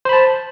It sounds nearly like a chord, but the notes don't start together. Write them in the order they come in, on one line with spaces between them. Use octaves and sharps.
C5 B5 A5